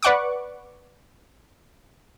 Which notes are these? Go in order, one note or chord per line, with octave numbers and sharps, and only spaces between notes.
B4 D5 F#5 C#6 D6